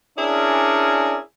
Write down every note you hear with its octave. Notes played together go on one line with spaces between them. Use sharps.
C#4 D4 E4 G#4 A#4 D5